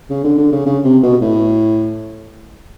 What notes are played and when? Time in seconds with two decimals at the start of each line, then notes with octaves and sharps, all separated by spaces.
0.10 C#3
0.24 D3
0.38 D3
0.52 C#3
0.66 C#3
0.84 C3
1.03 B2
1.22 A2